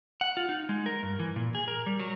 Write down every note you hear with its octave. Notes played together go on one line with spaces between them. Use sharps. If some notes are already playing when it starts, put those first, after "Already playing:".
F#5
F4
D#4
G#3
A#4
G2
E3
A#2
G#4
A#4
G3
F#3